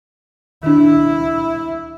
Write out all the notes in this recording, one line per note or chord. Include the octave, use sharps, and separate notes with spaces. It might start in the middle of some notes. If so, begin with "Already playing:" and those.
D#3 D4 E4